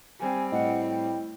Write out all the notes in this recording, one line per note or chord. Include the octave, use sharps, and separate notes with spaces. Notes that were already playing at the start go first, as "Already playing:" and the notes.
G3 C4 G#5
A2 D#5 F#5
G5